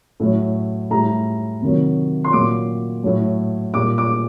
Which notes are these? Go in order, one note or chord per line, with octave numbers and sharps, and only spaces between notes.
A2 F#3
A2 G3 A#5
C3 D#3 F#3
C6
A#2 F#3 D6
A2 F#3
A#2 G3 D6
D6